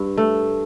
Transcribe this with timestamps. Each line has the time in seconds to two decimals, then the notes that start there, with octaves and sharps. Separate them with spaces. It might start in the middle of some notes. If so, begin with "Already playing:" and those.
Already playing: G2
0.18 A3